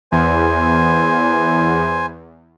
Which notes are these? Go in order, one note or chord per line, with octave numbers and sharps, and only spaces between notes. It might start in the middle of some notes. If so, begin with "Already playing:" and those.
E2 C5 G#5